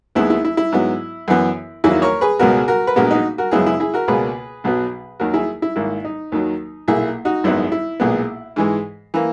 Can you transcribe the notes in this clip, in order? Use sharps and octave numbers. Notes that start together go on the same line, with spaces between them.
D#2 D#3 G#3 B3 E4
E4
E4
E4
G#2 F#3 B3
F#2 E3 B3
E2 D#3 F#3 A#3 E4
A#4 C#5
G#4 B4
C#2 B2 G#3 B3 F#4 A#4
F#4 A#4
B4
A#1 A#2 G#3 B3 F#4 A#4
D#4 F#4
F#4 A#4
F#2 C#3 G#3 B3 E4 G#4
E4 G#4
E4 G#4
F#4 A#4
C#2 B2 A#3 G#4 B4
B1 B2 F#3 B3
D#2 D#3 F#3 F#4 A#4
E4 G#4
E4
G#1 G#2 D#3 A#3 E4
D#4
D#2 D#3 F#3
B1 A#2 A#3 E4 G#4
D#4 F#4
G#1 F#2 D#3 G#3 B3 E4
E4
B1 A#2 G#3 B3
G#2 E3 G#3
E3 A#3